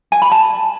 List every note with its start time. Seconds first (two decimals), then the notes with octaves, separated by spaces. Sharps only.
0.12 G#5
0.22 B5
0.32 A5